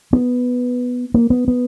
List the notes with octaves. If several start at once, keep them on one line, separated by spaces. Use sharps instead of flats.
B3
A#3
B3
B3